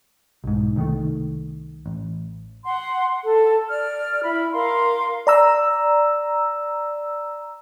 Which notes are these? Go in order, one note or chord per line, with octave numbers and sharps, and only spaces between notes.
B1 G#2
C2 D#3 A3
A1
F#5 C6
A4
D5 F6
E4 B5
A#4 F5 C6
D5 A#5 E6